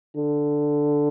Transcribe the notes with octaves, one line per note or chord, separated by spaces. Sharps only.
D3